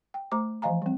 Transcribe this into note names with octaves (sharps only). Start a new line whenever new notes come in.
G5
A3 C5 A#5 D6
E3 F3 D#5 F5 G#5 A#5
G3 C4